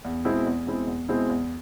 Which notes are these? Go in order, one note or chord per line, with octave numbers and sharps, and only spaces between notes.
E2
B2 G#3 C4 E4
E2
B2 G#3 C4 E4
E2
B2 G#3 C4 E4
E2